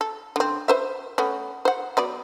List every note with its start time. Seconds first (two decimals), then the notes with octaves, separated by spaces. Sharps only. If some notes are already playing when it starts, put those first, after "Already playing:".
0.01 A4
0.36 D3 C4
0.68 B4 C5 E5
1.18 A3 B3 C#4
1.65 C5 F#5
1.97 F#3 B3 D5